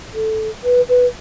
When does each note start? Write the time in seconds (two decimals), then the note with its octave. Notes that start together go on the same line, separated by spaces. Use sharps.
0.13 A4
0.63 B4
0.88 B4